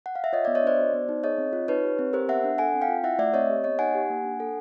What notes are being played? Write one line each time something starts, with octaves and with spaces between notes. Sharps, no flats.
F#5
F5
E5
F4 C#5 D#5
B3 D5 E5
C#5 D#5
D4 C5 D5
F#4
B3
D#4
G#4 C#5 D#5
C4
F4
D#4 B4 C#5
G4
C4
G4 A#4 C5
B3 E5 F#5
D4
A4 F#5 G#5
C4
F5 G5
F4
E4 E5 F#5
A3 D5 E5
C4 C#5 D#5
G4
B3 C#5 D#5
D#4 F#5 G#5
G4
A#3
D4
A4